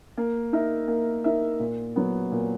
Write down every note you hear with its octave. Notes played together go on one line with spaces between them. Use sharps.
A#3
D#4 A#4 E5
A#3
D#4 A#4 E5
A#2
F#3 B3
A#2